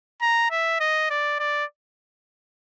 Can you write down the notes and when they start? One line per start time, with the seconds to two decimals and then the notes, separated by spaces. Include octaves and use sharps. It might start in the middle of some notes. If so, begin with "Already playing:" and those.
0.22 A#5
0.51 E5
0.80 D#5
1.10 D5
1.39 D5